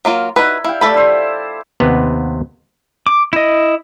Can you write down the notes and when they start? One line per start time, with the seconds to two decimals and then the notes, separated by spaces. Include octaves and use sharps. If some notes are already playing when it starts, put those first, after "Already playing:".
0.05 F#3 A#3 F4
0.36 D#4 E4 F#4 B4
0.64 E4 F5 G5
0.81 A3 A4 D5 E5 B5
0.94 E4 C5
1.80 D#2 C3 B3 B4 F#5
3.07 D6
3.33 E4 D#5